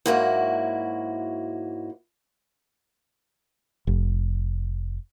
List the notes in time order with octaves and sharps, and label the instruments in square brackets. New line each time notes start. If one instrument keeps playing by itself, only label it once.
[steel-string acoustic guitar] G#2 F#3 A#3 E4 F#4
[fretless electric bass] F1